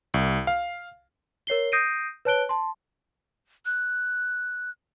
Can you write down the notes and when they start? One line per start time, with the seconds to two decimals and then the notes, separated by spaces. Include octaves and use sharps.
0.14 C2
0.47 F5
1.47 A#4 C#5 C7 G7
1.72 D#6 G6 A#6 C7 D7 D#7
2.25 B4 C#5 A5 F#6 D7 G7
2.49 A5 C6
3.65 F#6